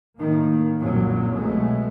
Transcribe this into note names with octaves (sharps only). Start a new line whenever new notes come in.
A2 D#3 A#3
C2 F#2 A#2 F#3
B2 G#3 A3